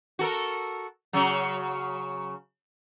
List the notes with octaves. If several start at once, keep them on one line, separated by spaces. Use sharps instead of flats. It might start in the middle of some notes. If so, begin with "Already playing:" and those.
F#4 A4 A#4
C#3 F#3